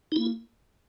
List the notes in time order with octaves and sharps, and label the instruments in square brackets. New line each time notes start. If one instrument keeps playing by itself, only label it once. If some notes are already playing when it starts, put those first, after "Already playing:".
[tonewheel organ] D#4
[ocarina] A#3 [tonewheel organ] E4